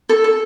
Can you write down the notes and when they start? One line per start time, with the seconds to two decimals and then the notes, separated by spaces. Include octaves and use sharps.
0.09 A4
0.24 A4